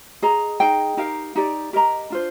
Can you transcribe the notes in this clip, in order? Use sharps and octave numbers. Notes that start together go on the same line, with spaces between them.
G#4 D#5 A#5
D#4 G#4 D#5 G5
D#4 G4 A#4 F5
D#4 G4 D5
G4 A#4 D#5 A#5
D4 F4 C5